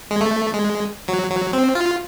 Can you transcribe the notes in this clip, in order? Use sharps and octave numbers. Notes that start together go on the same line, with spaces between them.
G#3
A3
G#3
F#3
F#3
C4
F4